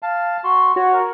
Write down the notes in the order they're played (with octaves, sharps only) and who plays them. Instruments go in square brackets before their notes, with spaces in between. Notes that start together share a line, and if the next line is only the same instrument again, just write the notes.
[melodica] F5 A5
F#4 C6
[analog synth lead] F#4 [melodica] C#5
[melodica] A#4